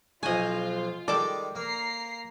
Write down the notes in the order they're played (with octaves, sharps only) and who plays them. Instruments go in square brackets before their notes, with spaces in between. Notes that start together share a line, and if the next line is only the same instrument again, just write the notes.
[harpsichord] B1 F3 F#4 [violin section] F4 [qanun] D#5 G#5
[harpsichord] D#3 G3 G#3 [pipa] A4 D5 [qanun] D6
[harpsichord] A#3 [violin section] A#5 C7